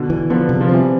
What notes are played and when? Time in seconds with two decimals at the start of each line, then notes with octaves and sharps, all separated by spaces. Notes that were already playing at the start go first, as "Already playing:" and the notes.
Already playing: B2 D3
0.10 E3
0.30 D3 F3 B3
0.49 C3 G3
0.61 F3
0.69 E3 G3 C4